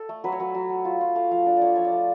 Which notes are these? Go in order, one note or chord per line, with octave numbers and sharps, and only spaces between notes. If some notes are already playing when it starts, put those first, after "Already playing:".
Already playing: A4
A3
F#3 B4
C#5
F#3 B4
F#3
F#3
F4
F4
A3 F5
F3 F5
D4 D5
A3 C#5 D5
F3 C#5
D5
A3